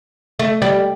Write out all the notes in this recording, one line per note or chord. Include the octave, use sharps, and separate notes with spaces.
A3
G3